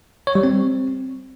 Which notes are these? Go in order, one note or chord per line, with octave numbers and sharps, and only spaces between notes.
C#5
G3
C4